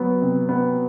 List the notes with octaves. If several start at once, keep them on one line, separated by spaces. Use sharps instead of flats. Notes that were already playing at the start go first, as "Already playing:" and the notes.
Already playing: F#3 B3
C3
B3